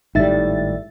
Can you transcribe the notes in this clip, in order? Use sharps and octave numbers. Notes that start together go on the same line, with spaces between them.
G#1 A2 G3 D#4 E5 A6